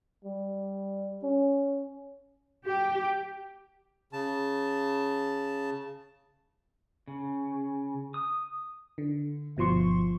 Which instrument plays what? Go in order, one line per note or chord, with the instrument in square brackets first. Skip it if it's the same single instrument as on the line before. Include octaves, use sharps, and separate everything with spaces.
[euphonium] G3
C#4
[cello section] G4
[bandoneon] C#3 A5
[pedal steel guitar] C#3
D#6
[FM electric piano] D3
G1 B2 F3 C6 C#6